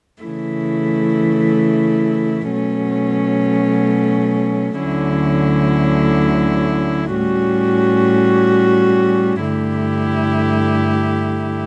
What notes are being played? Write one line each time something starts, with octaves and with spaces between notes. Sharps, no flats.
C#3 E3 A3 E4
B2 F#3 A3 C#4
D2 D3 F#3 C#4 E4
A2 G3 C#4 F#4
G2 D3 A3 E4 G4